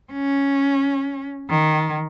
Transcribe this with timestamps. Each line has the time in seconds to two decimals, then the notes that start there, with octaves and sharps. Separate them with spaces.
0.13 C#4
1.49 D#3